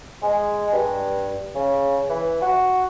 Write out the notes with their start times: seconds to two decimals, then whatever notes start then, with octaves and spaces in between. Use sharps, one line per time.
0.22 G#3
0.73 G2
1.55 C#3
2.09 E3
2.41 F#4